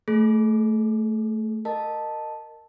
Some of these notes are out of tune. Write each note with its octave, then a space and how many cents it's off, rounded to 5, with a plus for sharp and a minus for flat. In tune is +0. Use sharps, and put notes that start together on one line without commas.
A3 +0 G#4 +40
A#4 -10 D#5 -15 A5 +0